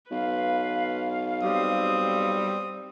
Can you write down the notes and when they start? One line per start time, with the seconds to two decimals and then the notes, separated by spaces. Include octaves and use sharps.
0.11 B1 B4 F5
1.43 G3 C4 D#6